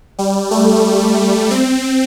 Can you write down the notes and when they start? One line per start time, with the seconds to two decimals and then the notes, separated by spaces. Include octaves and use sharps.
0.18 G3
0.51 A3
1.50 C4